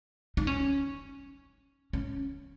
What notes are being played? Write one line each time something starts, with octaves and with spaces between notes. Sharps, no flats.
D#4
C#4
C#4